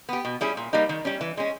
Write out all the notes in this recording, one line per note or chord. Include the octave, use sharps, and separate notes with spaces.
B3 G4
B2
G3 C#4 E4 G#4
A#2
G3 A#3 D#4
D#3
G3 C#4
E3
G#3 C#4